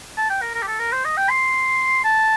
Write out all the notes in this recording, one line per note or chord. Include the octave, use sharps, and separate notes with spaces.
A5
G5
A#4
A#4
G4
A4
A#4
C5
D#5
G5
C6
A5